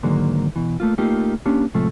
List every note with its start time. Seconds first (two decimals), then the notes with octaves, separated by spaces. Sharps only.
0.03 G#2 D3 D#3 F#3 G#3 A#3
0.56 B2 E3
0.80 A3 A#3 F4
0.98 A3 A#3 D#4 F4 G4
1.46 A#3 C#4 D4 G4
1.74 A2 C3 F3 G#3 A3